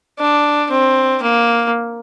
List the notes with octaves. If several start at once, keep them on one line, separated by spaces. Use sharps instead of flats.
D4
C4
A#3